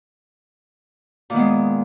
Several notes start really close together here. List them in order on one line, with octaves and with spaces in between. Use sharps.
A#2 D#3 B3 G#3